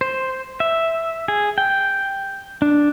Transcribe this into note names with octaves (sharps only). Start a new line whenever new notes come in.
C5
E5
G#4
G5
D4